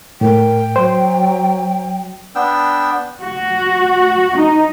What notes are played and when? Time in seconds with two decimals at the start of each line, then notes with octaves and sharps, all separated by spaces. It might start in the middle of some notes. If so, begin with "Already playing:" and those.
0.21 A2 A#4 G5
0.76 F#3 C5
2.35 B3 D4 G5 E6
3.22 F#4
4.36 D#4